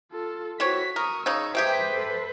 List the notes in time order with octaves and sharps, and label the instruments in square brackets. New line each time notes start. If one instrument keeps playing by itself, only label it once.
[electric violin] F4 A4
[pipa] E3 C4 C#5 [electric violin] F#4 B6
[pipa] A#4 [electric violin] C#6 D#6
[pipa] C#3 C#4 D#4 [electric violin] C#6 E6
[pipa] C3 G4 G#4 [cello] B4 C5 [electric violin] G5 B6
[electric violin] A4